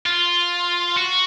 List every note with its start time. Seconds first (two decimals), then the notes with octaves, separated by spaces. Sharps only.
0.06 F4
0.97 F#4